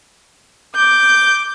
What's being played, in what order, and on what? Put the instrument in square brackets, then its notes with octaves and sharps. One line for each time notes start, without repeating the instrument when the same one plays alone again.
[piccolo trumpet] D6 [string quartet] G6